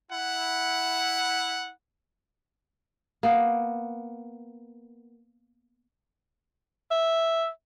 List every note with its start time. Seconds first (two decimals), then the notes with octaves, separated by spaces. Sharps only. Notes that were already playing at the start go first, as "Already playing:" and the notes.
0.11 E4 F#5
3.23 A#3 B3
6.91 E5